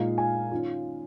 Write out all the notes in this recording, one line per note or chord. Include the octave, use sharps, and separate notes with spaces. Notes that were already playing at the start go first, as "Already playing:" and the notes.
Already playing: A#2 G#3 D#4 F5
G#5
D#3 C#4 F4